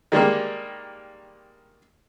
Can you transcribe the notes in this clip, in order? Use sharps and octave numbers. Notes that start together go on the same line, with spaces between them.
D#3 G3 G#3 A#3